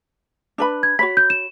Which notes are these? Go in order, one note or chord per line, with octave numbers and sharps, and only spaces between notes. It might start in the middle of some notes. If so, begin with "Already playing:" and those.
D4 B4 B5
G#6
F#4 C#5 B5 B6
G6
E7